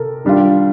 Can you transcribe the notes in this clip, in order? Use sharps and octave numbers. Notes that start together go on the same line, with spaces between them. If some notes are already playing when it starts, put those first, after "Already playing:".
Already playing: C3 A4 A#4
D#3 G3 D4 F4